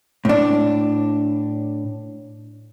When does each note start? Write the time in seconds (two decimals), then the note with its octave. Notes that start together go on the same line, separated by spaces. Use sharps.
0.25 A2 D4